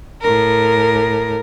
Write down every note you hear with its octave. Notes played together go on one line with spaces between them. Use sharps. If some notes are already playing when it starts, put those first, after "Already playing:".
A2 A#4